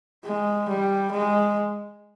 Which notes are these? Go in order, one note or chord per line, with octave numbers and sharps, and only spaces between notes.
G#3
G3
G#3